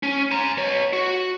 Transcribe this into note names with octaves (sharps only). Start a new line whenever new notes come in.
C#4
G#5 A#5
B3 C#5
F#4